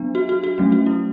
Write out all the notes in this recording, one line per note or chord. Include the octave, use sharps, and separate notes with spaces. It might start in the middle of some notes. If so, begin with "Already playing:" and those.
Already playing: F#3 B3 D4
F#4
F#4
F#4
F#3 A3 C#4
F#4
E4